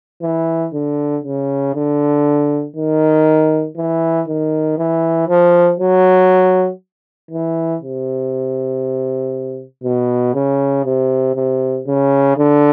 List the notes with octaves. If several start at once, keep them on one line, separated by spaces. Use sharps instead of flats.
E3
D3
C#3
D3
D#3
E3
D#3
E3
F3
F#3
E3
C3
B2
C#3
C3
C3
C#3
D3